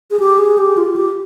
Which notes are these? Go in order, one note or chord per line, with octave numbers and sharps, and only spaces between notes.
G#4
G4
G#4
G4
F4
G4